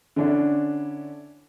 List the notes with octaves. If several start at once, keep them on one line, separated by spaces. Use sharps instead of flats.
D3 C#4 D4 E4